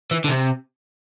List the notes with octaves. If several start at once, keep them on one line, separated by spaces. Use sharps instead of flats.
E3
D3
C3